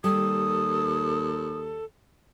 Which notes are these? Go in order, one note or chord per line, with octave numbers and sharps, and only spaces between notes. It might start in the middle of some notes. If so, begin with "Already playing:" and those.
D#2 G3 A4 D#6